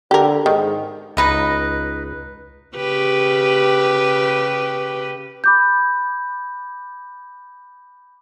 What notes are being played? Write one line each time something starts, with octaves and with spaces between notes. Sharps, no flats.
D3 G4 A#4
G#2 D#3
C#2 D#4 B4 D#5
C#3 G4 B4
B5 D6 G6